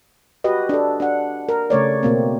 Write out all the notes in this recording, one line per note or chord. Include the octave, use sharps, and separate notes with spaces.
F#4 G4 B4 D#5
D4 A4
D4 F#5
A#4
C#3 A3 C#5 D5
B2 A#3 C4